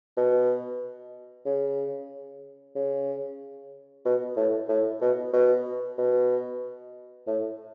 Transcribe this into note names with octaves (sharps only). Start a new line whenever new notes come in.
B2
C#3
C#3
B2
A2
A2
B2
B2
B2
A2